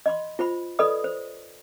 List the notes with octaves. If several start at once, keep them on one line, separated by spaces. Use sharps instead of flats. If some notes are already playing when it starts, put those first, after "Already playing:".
D#5 B5 C6
F4 C5 B5
A4 B4 D5 D#5 B5 D#6
C5